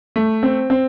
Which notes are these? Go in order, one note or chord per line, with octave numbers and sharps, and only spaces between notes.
A3
C4
C4